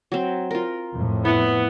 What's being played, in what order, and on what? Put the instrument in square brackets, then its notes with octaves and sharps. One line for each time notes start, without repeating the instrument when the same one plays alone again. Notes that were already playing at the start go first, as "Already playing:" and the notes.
[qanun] F#3 C4
F4 A#4
[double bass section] F2 A2
[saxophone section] B3 [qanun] E4